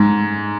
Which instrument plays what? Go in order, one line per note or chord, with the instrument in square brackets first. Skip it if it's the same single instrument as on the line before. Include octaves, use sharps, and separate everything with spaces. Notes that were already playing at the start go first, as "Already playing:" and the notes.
Already playing: [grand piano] G#2